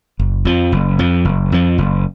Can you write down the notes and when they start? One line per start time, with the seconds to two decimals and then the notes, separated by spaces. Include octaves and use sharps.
0.19 F#1
0.45 F2 F3
0.72 F#1
0.99 F2 F3
1.25 F#1
1.52 F2 F3
1.78 F#1